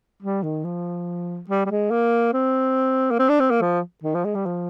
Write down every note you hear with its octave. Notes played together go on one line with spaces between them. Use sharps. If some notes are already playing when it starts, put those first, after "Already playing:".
G3
D#3
F3
G3
G3
G#3
A#3
C4
A#3
C4
D4
C4
A#3
F3
D#3
F3
G#3
G3
F3